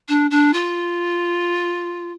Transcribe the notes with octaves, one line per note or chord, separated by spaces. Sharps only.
D4
D4
F4